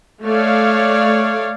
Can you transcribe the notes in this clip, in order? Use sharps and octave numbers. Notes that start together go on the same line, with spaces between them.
A3 C#5 D5 F5